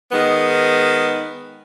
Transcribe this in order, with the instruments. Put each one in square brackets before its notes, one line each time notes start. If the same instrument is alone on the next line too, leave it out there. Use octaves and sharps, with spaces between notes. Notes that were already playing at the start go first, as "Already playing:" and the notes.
[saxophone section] D#3 G#3 B3